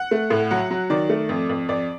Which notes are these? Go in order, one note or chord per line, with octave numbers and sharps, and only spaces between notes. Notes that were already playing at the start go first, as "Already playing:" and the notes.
Already playing: F#5
A3
A2
F#3 F#5
F#3
D#3 D5
A3
F2
F2
F2 D5